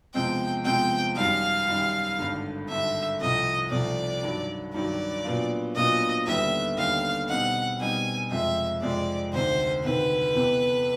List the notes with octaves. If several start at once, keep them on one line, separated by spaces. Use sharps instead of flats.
E2 C3 F3 G#3 C4 G5
E2 C3 F3 G#3 C4 G5
F#2 D#3 G3 F5
F#2 D#3 G3
G#1 G2 D3
G#1 G2 D3 E5
C2 C3 F3 A3 D#5
C2 C3 F3 A3 D5
G2 D#3 F#3
G2 D#3 F#3 D5
A#2 F#3 B3 D4 F4
A#2 F#3 B3 D4 F4 D#5
D#2 D3 G3 B3 E5
D#2 D3 G3 B3 F5
B2 G3 C4 D#4 F#5
B2 G3 C4 D#4 G#5
F2 C3 F3 G#3 E5
F2 C3 F3 G#3 D5
D2 C3 D#3 C5
D2 C3 D#3 B4
E2 C3 E3